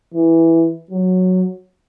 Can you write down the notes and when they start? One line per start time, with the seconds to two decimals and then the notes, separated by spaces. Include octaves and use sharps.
0.14 E3
0.91 F#3